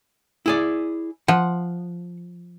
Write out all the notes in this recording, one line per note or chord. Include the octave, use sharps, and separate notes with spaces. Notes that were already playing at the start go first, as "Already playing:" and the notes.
E4 G#4 D5
F3 F#5